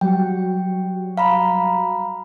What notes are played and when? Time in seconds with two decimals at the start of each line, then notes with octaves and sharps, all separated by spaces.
0.01 F#3 G3 F#4 G5
1.18 F5 A#5 B5